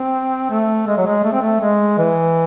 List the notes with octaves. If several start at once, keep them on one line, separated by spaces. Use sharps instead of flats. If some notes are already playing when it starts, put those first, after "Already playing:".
Already playing: C4
A3
G#3
F#3
G#3
A3
C4
A3
G#3
E3